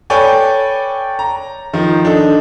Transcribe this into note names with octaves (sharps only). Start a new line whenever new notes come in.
A4 B4 C#5 D5 G5 G#5
A#5
D#3 F3
D4 D#4 A4